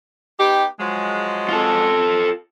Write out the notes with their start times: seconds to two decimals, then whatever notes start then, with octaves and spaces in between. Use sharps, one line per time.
0.38 B3 D#4 G4
0.78 F3 F#3 G#3
1.49 F4 A4